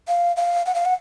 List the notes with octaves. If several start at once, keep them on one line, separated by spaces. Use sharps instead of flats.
F5
F5
F#5
F5
F#5